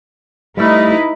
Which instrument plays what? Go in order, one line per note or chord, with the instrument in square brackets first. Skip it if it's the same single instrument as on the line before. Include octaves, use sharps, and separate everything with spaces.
[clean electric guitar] G3 A3 [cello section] D#4 E4 B4